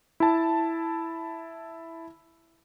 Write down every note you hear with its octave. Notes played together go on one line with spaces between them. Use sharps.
E4 A5